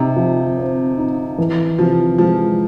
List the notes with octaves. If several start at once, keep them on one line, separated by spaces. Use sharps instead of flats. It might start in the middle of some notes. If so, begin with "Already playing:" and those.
Already playing: C3 D#4
F3
C4
D#4
E3
C3 F3
F3 G#3